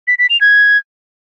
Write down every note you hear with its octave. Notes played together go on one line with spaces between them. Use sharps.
B6
B6
F7
G#6